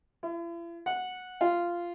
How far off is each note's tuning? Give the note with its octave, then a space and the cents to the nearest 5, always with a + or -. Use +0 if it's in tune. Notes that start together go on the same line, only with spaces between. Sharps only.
E4 +45
F#5 -10
F4 -10